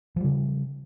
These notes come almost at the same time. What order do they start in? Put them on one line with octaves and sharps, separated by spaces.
F3 G3 C#3